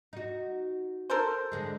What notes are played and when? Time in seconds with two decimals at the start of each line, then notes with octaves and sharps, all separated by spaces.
0.13 D#4 F#4
1.10 A4 A#4 C5
1.52 E2 D3 G#3